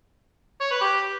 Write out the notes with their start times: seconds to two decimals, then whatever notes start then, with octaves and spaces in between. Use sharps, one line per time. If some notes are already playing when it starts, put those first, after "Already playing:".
0.61 C#5
0.71 B4
0.81 G4